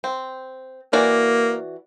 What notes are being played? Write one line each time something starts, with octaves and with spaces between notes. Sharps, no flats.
C4
E3 A#3 F#4 D5